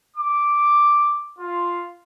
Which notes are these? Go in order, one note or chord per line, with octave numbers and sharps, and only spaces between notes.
D6
F4